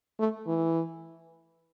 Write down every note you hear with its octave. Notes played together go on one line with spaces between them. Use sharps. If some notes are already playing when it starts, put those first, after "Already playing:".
A3
E3